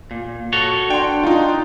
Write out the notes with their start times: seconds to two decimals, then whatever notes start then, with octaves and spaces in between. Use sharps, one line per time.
0.11 A#2
0.53 F#4 A4 C#5
0.90 D4 G5 C6
1.24 D#4 F4